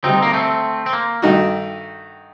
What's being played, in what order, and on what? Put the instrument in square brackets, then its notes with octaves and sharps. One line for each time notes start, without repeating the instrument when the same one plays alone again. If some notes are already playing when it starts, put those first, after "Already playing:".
[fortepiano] D2 C3 G3 [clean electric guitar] C4 D#4
[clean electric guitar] A#3
A3 C4
C4
A#3
[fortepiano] G2 D#3 A3 D#4 F#4